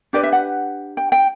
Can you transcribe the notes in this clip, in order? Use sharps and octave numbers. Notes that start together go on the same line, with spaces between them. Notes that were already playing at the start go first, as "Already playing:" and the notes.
D4 G4 B4 D5
E5
F#5
G5
G5